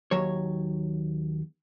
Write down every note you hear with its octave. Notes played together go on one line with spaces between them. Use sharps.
D#2 F#3 C#5